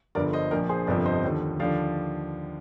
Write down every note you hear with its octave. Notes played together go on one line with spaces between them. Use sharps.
G1 G2 D3 F3 A#4 D5
C5 D#5
A#1 A#2 F3 A#4 D5
G#4 C5
G1 F2 C3 F3 A#4 D5
C5 D#5
D#2 D3 F3
D#2 D3 F3 D5 F5